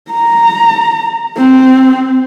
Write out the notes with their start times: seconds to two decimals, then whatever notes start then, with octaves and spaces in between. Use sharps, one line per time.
0.11 A#5
1.37 C4